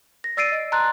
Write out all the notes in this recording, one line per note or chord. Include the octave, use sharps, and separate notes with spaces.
A#6
D5 E6 A6 C7 D7 D#7
D#5
A5 A#5 C6 F#6 A6